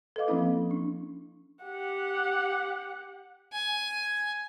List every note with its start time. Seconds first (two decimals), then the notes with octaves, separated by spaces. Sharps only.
0.16 A4 B4 D#5 F5 D6
0.28 F3 A#3 C4 C#4 E4
0.71 C#4 D4
1.65 G4 F#5
3.53 G#5